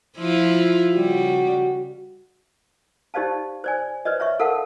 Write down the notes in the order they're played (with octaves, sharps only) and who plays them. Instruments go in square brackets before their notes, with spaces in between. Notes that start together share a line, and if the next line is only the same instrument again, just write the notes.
[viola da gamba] F3 E4 F4
[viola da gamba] C#3 G3 [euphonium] F#4
[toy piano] D#4 G4 C5 D5 F5 A5
C5 D5 G#5
B4 C5 D5 D#5
C#5 E5 C#6
A4 A#4 F5 F#5 A5